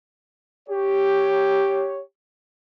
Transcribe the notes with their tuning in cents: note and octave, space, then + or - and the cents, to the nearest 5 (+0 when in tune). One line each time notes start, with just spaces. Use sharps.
G4 +0 C#5 +0